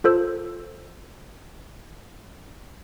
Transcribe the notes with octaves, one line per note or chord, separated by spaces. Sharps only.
F4 A4 C5 E6